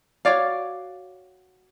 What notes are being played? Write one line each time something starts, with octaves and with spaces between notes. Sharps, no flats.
F#4 C#5 D5 F5